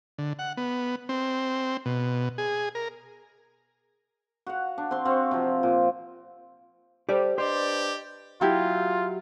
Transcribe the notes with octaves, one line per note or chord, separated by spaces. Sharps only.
D3
F#5
B3
C4
B2
G#4
A#4
F#4 F5 F#5
D4
C4 C6
C4 F#4 F5 C#6
C3 F3
A#2
G4 A4 C5 D5 A5
D4 G4 B4 C5 D5 D#5
F#3 E4 F4 G4